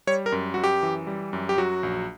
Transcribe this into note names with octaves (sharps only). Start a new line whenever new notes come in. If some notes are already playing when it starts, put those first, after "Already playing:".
G3 C#5
A#4
F#2
F#2 F#4
G4
E3
G3
F#2
G4
F#3 F#4
A#1